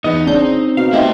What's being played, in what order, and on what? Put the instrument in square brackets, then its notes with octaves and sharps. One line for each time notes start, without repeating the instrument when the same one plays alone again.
[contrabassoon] E2 [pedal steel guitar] B3 D#5 [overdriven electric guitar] D#4
[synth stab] G1 D4 G6 [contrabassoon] C#3 [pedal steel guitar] C4
[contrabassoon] B2 [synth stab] F5
[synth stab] A3 D#4 G4 [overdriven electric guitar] E4 C5